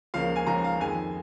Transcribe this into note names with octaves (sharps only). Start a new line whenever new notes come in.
C#2 C#3 F3 A#3 F5
G#5
C#2 C#3 F3 A#3 A#5
F5
F2 D#3 G#3 G#5